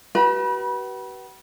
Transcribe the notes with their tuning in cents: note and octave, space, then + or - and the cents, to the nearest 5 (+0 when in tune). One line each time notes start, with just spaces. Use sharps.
F#4 +45 B4 -25 B5 -30